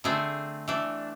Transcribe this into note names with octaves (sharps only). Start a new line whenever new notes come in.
D3 A3 C4 G#4
E3 A3 D4